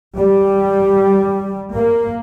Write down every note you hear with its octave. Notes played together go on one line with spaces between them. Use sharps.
G3
A#3